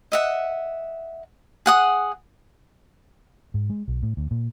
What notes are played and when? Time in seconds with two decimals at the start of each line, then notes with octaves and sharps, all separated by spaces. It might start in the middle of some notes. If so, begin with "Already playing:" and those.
0.12 D#5 E5 F#5
1.66 G#4 F#5 D#6
3.54 G#2
3.70 G#3
3.88 B1
4.03 A2
4.17 D2
4.31 A#2